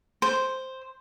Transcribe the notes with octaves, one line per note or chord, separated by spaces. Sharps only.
C5